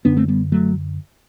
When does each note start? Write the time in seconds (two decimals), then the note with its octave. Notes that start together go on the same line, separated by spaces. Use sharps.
0.05 F#2 D3 B3 D4
0.17 A3 C4
0.28 G3 B3
0.52 F#3 A3